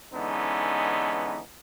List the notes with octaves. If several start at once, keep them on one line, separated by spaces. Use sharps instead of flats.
D3 E3 G#3 B3 C#4 D#4